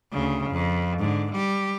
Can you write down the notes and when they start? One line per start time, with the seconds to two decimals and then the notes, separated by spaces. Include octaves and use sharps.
0.12 D2 C#3
0.50 F2
0.99 G#2 D3
1.32 G3 G4